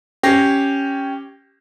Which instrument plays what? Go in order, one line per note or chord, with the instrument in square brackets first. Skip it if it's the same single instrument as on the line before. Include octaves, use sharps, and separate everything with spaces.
[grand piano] C#4 G4 A#6 C7